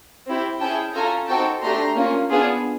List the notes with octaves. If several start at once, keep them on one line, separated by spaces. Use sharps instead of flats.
C4 E4 G4
C#4 E4 G#4 G5 A5
C#4 F4 A4 G#5 A#5
C4 D#4 F#4 A4 G5 A5
A3 D4 G4 A#5 C6
A#3 C#4 F4
B3 D4 F4 G#4